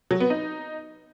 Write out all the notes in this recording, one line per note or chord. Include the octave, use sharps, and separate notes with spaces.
F#3
B3
D#4